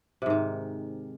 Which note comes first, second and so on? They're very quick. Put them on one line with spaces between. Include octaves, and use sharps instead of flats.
C3 G#2 D#3